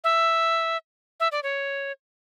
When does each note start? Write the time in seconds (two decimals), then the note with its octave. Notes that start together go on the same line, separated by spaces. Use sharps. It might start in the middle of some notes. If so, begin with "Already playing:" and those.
0.04 E5
1.20 E5
1.32 D5
1.43 C#5